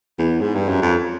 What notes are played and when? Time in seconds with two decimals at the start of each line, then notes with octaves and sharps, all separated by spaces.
0.19 E2
0.41 G#2
0.55 G2
0.68 F#2
0.82 F2